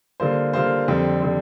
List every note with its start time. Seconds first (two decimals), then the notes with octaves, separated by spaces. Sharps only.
0.20 D3 G3 A#3 F4 C5
0.53 D3 G3 A#3 F4 C5
0.88 F2 D3 G3 C4
1.22 D3 G3 C4